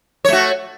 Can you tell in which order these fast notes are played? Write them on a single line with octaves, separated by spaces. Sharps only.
C#5 A3 F#4